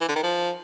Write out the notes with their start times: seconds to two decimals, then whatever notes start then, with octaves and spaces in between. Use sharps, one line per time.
0.01 E3
0.08 D3
0.16 D#3
0.23 F3